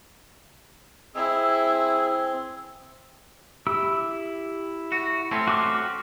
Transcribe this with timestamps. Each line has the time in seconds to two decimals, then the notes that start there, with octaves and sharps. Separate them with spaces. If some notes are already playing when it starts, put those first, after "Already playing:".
1.15 C4 E4 G#4 E6
3.67 E4 G4 E6
4.92 F#4
5.31 A3 C4 C#4
5.47 F#4 D6 F6